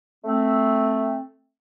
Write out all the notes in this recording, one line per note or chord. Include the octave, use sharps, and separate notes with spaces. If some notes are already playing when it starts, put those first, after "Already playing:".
A3 C4